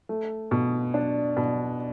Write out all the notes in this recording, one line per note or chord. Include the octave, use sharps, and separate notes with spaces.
A3
B2
D4
B2